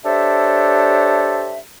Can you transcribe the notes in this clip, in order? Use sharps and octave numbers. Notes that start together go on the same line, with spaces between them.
D4 G4 A4 C5 C#5 E5